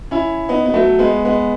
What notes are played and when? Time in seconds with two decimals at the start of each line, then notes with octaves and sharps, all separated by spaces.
0.11 C#4 E4
0.49 B3 D#4
0.66 B3
0.74 F#3 A3
0.99 G#3 B3
1.25 G#3 B3